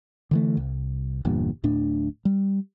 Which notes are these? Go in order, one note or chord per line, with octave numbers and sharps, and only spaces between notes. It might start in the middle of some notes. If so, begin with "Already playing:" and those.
D3 E3 A3
C2
G1 E2 G2 A#2
D1 A2 D4
G3